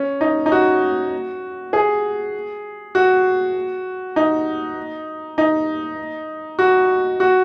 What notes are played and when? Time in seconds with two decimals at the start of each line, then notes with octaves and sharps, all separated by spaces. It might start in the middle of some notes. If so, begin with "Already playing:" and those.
Already playing: C#4
0.21 D#4
0.46 D#4
0.52 F#4
1.73 G#4
2.95 F#4
4.16 D#4
5.38 D#4
6.59 F#4
7.20 F#4